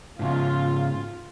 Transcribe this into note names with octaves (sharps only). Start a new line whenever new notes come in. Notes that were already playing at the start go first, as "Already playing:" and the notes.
G#2 C#3 F4